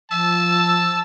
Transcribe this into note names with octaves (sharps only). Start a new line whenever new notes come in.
F3 A5 E6